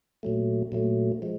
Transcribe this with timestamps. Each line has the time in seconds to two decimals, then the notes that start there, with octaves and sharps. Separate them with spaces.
0.23 A#2 F#3 A3
0.72 A#2 F#3 A3
1.22 F3 G#3